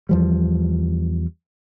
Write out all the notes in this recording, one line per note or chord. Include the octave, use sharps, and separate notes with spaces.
E2 F3 G3